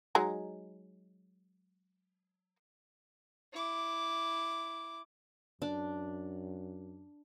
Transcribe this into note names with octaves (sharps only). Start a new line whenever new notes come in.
F#3 G#3 D#4
E4 D6
F#2 D4